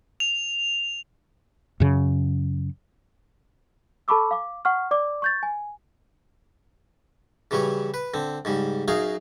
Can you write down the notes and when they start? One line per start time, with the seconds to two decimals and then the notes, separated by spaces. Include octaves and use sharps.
0.20 F7
1.80 F#2 C#3
4.08 A4 A5 B5 C#6 D6 E6
4.31 F5 D6
4.65 F#5 C#6 F6
4.91 D5 D6
5.22 C#6 G6 A6
5.43 G#5
7.51 C#3 E3 F#3 G3 C#5
7.94 B4
8.14 D3 C4
8.45 G#2 C#3 G3
8.88 F#2 F#3 D#4 G#4 F5